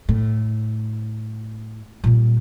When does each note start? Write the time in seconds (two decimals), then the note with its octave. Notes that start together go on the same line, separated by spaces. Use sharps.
0.09 A2
2.04 A#2 G3